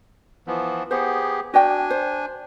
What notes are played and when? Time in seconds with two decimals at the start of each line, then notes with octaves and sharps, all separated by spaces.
0.47 E3 F3 B3
0.91 B3 G4 G#4 C5 F#5
1.54 D4 F#4 D5 G5 G#5
1.90 C5